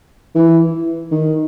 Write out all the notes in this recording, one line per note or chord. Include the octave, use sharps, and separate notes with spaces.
E3
D#3